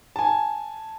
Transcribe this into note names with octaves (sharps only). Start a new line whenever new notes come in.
G#5 A5